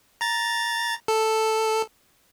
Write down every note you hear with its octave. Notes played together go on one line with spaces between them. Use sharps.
A#5 A6
A4